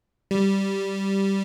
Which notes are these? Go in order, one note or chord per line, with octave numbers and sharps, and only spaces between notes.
G3